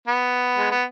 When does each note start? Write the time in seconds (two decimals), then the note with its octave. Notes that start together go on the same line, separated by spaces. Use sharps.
0.07 B3
0.58 G#3
0.71 B3